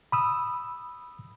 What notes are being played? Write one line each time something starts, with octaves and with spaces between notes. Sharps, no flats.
B5 D#6 E6